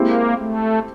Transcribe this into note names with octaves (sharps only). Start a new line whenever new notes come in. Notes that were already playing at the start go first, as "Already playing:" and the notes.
Already playing: G#3 A#3 C4 E4 G4
A3